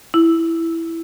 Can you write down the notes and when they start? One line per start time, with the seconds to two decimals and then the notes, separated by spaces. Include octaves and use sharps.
0.14 E4